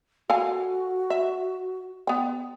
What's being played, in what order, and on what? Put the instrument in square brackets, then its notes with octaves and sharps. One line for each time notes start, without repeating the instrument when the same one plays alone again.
[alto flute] F#4 [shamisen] A4 F5 G#5
[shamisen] E5
B3 G5